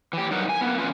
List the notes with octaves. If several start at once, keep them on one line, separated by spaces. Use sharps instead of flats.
E3 G4
G2 F#3 D#4 A#4 B4 F#5
G#5
A#3 B3
E2 C#4 F4 B4